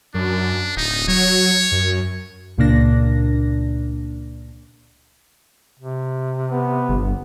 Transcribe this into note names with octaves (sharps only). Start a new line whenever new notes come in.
F#2 D4
D1 D#4
F#3 C#5
F#2
C#2 A#2 C#3 A#3 D4 A#6
C3
B3
G1